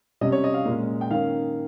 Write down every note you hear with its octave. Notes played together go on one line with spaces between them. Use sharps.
C3 G3 C#4 D#5
C#5
D#5
F5
A#2 G#3 C#4
G5
D#3 A#3 C#4 F5